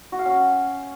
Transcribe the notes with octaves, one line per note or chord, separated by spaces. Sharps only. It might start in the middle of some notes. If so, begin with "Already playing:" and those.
F#4
F5
C#4